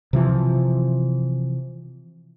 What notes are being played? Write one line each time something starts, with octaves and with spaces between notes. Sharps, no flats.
C3 E3 F3